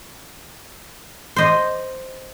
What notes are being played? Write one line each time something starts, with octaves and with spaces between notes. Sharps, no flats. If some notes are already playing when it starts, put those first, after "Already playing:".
C5 D#5